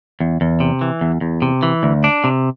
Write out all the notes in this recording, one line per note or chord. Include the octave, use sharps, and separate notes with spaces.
E2
E2
C3
E3
E2
E2
C3
E3
D2
D4
C3